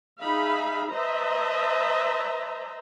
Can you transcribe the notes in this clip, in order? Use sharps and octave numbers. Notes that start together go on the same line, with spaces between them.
D#4 G#4 E5 F5 B5
B4 C5 D#5 E5 A5 A#5